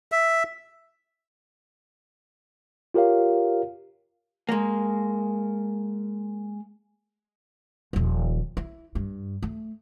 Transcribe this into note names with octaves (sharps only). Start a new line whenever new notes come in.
E5
F4 G4 A#4 C#5 F5
G#3 A#3
D#1 F3
E4
G2
A3